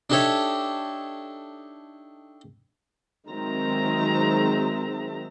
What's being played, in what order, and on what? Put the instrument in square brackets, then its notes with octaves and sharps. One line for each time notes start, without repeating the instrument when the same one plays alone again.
[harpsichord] D4 D#4 G4 A4 C#5 E5
[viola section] D#3 F#3 G#3 C4 E5 A#5